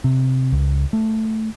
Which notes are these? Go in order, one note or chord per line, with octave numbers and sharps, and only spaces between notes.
C3
C#2
A3